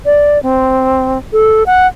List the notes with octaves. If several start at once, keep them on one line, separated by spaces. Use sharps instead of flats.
D5
C4
A4
F#5